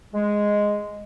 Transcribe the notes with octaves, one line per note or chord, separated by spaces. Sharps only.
G#3